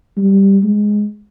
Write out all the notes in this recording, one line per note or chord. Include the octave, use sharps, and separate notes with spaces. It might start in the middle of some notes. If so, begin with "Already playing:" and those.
G3
G#3